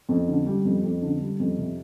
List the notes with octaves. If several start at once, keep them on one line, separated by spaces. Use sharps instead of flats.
F2
D3
G3
F2
F2
D3
G3
F2
C3